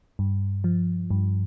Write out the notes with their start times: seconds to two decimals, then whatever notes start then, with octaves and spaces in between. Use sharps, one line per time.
0.19 G2
0.64 F3
1.11 G2